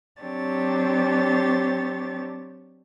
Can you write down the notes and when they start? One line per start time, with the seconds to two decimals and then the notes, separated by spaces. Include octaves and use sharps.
0.22 F#3 C4 D4 G4 C#5 A6